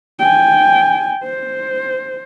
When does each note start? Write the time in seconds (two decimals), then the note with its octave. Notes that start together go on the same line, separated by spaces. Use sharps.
0.19 G5 G#5
1.23 C5